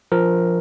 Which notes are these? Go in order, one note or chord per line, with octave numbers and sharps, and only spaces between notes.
F3 A#4